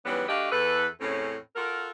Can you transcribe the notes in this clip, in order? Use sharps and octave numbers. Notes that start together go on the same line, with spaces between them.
G#2 E3 F#3 G3 B3 C#4
A3 D4 F#4 G4 D#5 F5
E2 A4 B4
E2 A2 C4 C#4
F4 F#4 A4 A#4